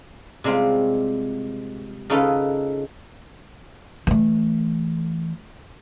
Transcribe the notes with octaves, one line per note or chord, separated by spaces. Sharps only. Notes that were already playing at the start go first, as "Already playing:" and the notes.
C3 G3 G#3 C4 F4
C#3 C#4 D#4 F4 A4 B4
E3 A3